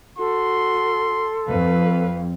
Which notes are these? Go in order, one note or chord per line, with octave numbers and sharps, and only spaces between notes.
F#4 A4 C6
F2 B4 F5